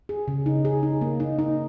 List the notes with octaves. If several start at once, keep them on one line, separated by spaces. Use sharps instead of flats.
G#4
C#3
D#4
G#4
D#4
A#3
D#4
D#4